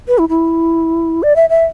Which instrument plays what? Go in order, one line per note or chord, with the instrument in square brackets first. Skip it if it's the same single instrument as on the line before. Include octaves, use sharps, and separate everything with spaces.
[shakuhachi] B4
E4
E4
D5
E5
E5